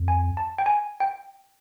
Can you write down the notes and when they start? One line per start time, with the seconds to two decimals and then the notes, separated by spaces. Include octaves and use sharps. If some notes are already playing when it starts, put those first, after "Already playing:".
Already playing: F2
0.08 G#5
0.37 A5
0.58 G5
0.66 G#5
1.00 G5